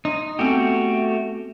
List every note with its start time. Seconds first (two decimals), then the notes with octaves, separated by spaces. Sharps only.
0.05 D#4 C6
0.39 A3 B3 C4 F#4 G4